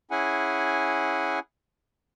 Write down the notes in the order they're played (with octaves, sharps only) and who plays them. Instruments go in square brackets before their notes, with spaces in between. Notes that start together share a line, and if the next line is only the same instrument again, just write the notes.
[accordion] C#4 E4 G#4 F#5 G#5